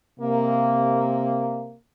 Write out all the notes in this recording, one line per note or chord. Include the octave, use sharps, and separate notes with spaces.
C3 A#3